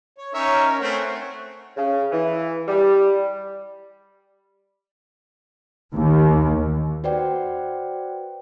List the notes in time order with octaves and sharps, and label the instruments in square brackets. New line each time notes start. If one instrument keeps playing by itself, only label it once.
[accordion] C#5
[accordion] C#4 A#4 [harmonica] D#4 C#5 E5
[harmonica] A3 C4 [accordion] C#5 F#5
[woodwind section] C#3
E3
G3
[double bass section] D#2
[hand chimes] F#4 B4 C5 D5 F#5 G5